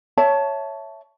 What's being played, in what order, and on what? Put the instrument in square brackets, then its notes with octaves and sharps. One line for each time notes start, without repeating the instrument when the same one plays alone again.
[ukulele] C#5 E5 A5